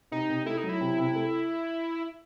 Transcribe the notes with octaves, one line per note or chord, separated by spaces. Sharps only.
C3 D#4
C3
A3 E4
D#4
F#3
E4
C3
C3
A3